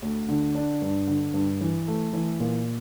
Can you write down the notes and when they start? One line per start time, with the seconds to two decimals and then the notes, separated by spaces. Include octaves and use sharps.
0.02 D2
0.29 D3
0.55 D4
0.82 G2
1.07 D3
1.34 G2
1.61 E3
1.88 A3
2.13 E3
2.40 A#2